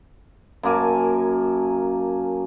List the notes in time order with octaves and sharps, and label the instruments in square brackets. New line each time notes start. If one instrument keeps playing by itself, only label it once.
[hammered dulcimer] F#2 A#3 G#5 A5